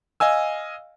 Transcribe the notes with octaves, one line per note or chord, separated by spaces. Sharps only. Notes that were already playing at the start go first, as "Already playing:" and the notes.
D#5 F5 G#5 E6